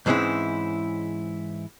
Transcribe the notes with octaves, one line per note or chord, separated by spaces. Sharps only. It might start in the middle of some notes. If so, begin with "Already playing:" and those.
G#2 E3 G#3 C4 C#4 E4